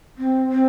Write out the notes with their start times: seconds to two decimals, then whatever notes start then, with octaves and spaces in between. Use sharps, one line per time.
0.18 C4
0.52 C4